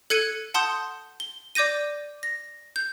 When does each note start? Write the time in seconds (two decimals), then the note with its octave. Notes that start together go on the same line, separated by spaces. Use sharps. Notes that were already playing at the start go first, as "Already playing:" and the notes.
0.10 A4 F#6 G#6 C#7 D#7
0.54 F#5 A5 C6 D#6 G6
1.20 G7
1.55 D5 D6 G6 A#6 D#7
2.23 A#6
2.76 G6